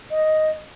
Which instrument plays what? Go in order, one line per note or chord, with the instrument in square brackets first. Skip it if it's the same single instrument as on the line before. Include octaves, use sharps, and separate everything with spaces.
[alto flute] D#5